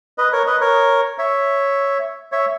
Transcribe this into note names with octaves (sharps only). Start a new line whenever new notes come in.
B4 D#5
A#4 C#5
B4 D#5
A#4 C#5
C#5 E5
C#5 E5